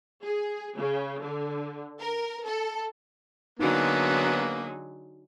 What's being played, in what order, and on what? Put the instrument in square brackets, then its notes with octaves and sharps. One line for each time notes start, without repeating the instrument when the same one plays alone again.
[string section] G#4
C#3
D3
A#4
A4
[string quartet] D3 F#3 G#3 [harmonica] A#3 B3 [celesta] D#4 F#4